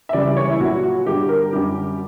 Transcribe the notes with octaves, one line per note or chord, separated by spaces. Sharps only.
E5
C#2 C#3 E3 G3 D5
C#5
E4
A#2 F#3 F#4
F#4
G2 D3 G3 G4
A#4
F#2 D3 G3 G4